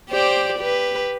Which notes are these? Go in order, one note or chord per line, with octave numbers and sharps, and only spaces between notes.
G4 C5 D5
G4 B4